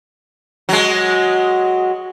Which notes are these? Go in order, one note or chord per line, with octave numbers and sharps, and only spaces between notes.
F#3 G#3